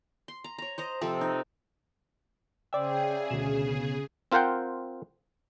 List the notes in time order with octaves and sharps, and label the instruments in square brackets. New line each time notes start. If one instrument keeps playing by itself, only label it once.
[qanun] C6
A#5
C#5 A#5
C5 D#5 A#5
C3 F3 C4 A4
D#4
[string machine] C#3 G#4 [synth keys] C5 D5 E5 [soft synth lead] G5
[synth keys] D2 E7 [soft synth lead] B2
[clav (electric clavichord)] C4 F4 A#4 C5 F#5 G5